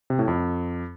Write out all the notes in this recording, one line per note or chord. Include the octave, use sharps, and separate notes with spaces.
C3
A2
F2